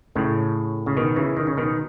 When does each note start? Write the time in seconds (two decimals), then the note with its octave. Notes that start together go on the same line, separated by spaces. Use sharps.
0.15 A2 C#3
0.86 C#3
0.96 B2 D#3
1.16 C#3 E3
1.37 D#3
1.47 C#3
1.57 B2 D#3